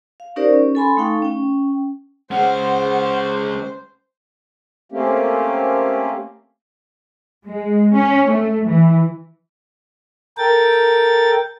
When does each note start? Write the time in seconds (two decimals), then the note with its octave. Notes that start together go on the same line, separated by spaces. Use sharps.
0.20 F5
0.36 C#4 D#4 G4 A#4 C5 D5
0.53 C#4
0.75 A4 G#5 B5 C6
0.97 A3 D#4 A4 F5 G5 C#6
1.22 C#4 G5
2.31 G#3 C#4 C5 F#5
4.92 A3 A#3 C4 C#4 G4
7.47 G#3
7.94 C#4
8.31 A3
8.66 E3
10.38 A4 A#4 G5 A6